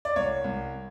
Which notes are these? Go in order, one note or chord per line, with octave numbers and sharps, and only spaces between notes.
D5
C2 C#5
C2